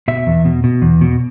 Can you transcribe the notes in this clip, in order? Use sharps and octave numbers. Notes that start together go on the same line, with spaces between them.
B2 E5
E2
B2
B2
E2
B2